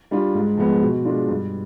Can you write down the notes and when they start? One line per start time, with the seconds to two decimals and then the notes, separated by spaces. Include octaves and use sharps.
0.11 G3 D4 F4
0.34 G#2
0.57 F3 G#3 B3
0.82 B2
1.05 G#3 D4 F4
1.29 G2